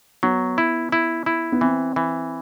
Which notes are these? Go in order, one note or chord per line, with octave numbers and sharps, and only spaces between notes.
F#3 B3
E4
E4
E4
B3
E3 C4
E3